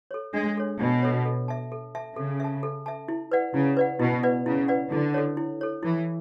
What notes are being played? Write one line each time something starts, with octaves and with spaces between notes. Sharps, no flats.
A4 C#5
G#3 D4
A4 C#5
B2 D4
A4 C#5
A4
E5 A5
A4
E5 A5
C#3 A4
E5 A5
A4
E5 A5
E4
B4 D5 F#5
C#3 E4
B4 D5 F#5
B2 E4
B4 D5 F#5
C#3 E4
B4 D5 F#5
D3 E4
A4 C#5
E4
A4 C#5
E3 E4